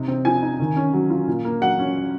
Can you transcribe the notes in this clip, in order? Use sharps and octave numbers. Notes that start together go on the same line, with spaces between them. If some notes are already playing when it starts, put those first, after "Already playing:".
Already playing: C3 D#4
C4
F3 G#5
D#4
D#3
C#4
F#3
F4
A#2
A#3
F#3 F#5
C#4